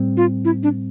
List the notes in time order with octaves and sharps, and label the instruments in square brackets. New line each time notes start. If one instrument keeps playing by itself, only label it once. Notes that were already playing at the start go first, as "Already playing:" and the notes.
Already playing: [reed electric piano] A2 G3 C4
[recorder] F4
E4
D4